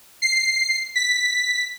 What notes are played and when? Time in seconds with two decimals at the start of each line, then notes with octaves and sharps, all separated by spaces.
0.22 C7
0.95 B6